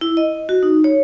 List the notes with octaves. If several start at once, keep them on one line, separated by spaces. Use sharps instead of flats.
E4
D#5
F#4
D#4
C#5